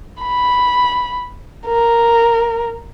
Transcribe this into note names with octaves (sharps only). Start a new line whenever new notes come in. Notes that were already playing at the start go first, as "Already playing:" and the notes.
B5
A#4